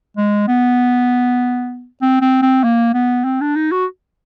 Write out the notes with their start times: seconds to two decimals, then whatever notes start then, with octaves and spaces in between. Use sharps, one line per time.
0.17 G#3
0.48 B3
2.02 C4
2.22 C4
2.42 C4
2.64 A#3
2.94 B3
3.25 C4
3.41 D4
3.56 D#4
3.72 F#4